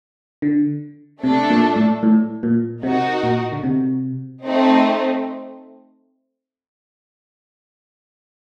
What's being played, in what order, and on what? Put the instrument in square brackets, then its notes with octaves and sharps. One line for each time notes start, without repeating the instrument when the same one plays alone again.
[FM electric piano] D3
[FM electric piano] C3 [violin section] A3 D4 A4
[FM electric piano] A#2
A2
A2
A#2
[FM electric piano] C3 [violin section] D#4 F#4 A#4
[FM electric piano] A#2
D3
C3
[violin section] A3 C4 D#4